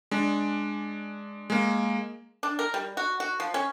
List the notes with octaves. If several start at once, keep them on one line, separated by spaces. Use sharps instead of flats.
G#3 D4
G#3 A#3
D4
A#4
G3
F#4
F#4
F3
C#4